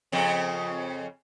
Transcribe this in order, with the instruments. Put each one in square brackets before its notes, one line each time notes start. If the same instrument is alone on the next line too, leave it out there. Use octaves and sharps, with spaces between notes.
[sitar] F2 C#3 C4